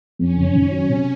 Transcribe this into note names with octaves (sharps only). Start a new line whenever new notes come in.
F2 C#4
F#1
D#3 C#4
F#3
C3